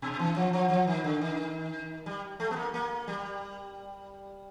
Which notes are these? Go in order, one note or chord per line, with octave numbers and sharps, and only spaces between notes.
B2
E3
F3
F3
F3
D#3
D3
D#3
G3
A3
B3
A#3
A#3
G3